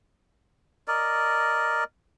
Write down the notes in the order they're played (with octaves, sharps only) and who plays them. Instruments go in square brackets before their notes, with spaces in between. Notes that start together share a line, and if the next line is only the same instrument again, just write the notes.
[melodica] A#4 D5 D#5